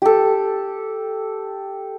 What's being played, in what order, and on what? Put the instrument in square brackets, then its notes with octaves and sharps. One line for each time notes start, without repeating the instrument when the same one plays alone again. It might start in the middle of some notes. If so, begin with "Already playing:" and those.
[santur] G4 A4